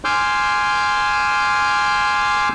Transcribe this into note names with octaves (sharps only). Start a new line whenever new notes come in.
G#5 C6 D6 E6 F6 G6